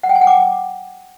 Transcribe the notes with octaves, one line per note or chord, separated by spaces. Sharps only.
F#5
G5
G#5
F#5
D6